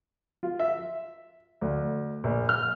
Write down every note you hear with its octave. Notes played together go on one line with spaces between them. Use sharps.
F4
E5
D2
A#1
F6